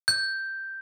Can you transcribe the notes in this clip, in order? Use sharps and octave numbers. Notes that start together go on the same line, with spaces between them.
G6